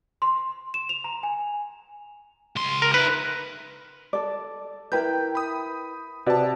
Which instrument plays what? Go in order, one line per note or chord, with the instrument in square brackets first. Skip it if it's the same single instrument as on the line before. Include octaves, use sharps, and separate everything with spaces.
[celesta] C6
E7
F7
A#5
G#5
[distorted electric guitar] C#2 C6
[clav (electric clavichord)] A#4
[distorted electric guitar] D#4 E5 [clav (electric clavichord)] B4
[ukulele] A4 D5
[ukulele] E4 A#4 B4 [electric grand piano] G5 G6
[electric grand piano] B5 D#6
[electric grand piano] C3 A5 [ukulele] F#4 B4 D5